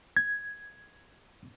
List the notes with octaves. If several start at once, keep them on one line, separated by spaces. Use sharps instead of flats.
G#6